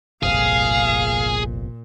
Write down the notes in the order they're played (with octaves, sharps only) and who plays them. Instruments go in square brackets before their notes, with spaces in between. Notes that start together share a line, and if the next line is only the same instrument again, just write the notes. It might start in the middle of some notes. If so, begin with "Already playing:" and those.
[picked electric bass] G1 C2 F2 [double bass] A#2 [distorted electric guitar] G#4 [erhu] F5